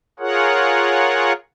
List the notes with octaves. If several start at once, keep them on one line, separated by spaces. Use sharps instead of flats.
F4 G#4 A#4 C#5 F#5